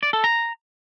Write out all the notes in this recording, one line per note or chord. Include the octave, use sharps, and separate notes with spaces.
D5
A4
A#5